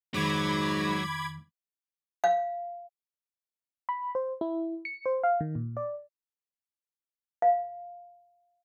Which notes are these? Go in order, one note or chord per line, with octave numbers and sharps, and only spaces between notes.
F2 G#2 D#3 F#3 B5 D6 G#6
F5
B5
C5
E4
C#7
C5
F5
D#3
A#2
D5
F5